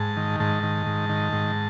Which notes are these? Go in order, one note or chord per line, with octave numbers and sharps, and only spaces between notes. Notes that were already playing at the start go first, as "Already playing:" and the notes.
Already playing: G#2 A5
D#3
G#2 A5
D#3
G#2
D#3
G#2